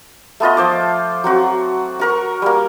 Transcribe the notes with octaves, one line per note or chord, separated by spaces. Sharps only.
A3 B3 F4 D#5
F3 C5 D6
F#3 C4 F#4
F#4 A#4 C#6
G3 A#3